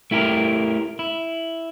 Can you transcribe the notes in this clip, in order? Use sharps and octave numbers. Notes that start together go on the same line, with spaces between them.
A3 E4 G4 A4 A#4
E4